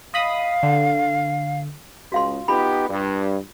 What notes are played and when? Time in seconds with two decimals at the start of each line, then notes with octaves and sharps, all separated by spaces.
0.14 D#5 F5 B5 D#6
0.63 D3
2.12 C#2 F#4 F5 C6
2.48 B3 D#4 F4 G4 B5
2.88 G2